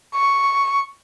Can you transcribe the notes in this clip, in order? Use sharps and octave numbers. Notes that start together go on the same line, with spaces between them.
C#6